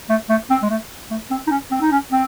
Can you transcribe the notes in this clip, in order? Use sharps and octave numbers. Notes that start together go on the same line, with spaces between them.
A3
A3
C4
G#3
A3
A3
C4
D#4
C#4
C4
D#4
C#4
C4